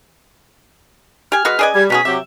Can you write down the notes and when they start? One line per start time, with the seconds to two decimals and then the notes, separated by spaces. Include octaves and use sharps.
1.32 G4 G#5 F6
1.45 G#3 F#4 B4
1.59 C#4 G#4 B4 D5 D#5 G#5
1.74 G3 G#6
1.90 B2 F#3 C#4 G#4 B6
2.05 C3 F#3 G4 E5